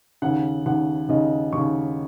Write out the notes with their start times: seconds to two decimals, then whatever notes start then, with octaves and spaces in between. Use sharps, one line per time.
0.22 D#2 C#3 F#5
0.66 D#2 C#3 F#5
1.09 D#2 C#3 D#5
1.53 D#2 C#3 C#6